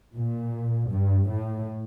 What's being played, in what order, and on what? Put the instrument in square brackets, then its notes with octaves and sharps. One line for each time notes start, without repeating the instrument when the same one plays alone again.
[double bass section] A#2
G2
A2